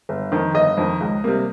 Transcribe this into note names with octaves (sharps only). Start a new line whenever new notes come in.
G1
F2 D#3
G1 D#5
F2 D#3
C#2
C3 G3 A#3